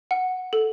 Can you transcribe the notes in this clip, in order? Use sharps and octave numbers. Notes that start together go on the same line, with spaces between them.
F#5
A4